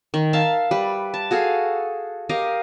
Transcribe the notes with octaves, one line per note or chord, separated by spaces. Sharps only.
D#3
E5 F5 A5
G3 B4
A5
F#4 G#4 A4 F5
G4 A#4 D#5 F5